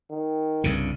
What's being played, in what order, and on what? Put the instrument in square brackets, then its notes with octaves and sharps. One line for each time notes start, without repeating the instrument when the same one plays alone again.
[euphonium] D#3
[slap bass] C2 G2 C#3